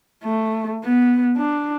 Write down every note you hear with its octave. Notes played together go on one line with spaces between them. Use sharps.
A3
B3
D4